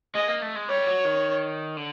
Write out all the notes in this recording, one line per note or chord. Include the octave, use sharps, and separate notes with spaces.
G#3 D#5
A#3
A3
G#3
G3 C#5
F#3
D#3
D3